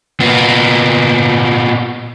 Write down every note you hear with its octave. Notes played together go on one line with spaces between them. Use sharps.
A#2 B3